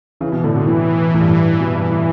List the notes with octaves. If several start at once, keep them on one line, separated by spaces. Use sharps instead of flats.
C#3 E3
B2
A2 D3
B2
A2 E3
A2
G2
A2
B2
G2
A2